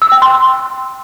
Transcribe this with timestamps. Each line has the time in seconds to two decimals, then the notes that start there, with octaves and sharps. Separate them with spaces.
0.02 E6
0.12 G5
0.22 C6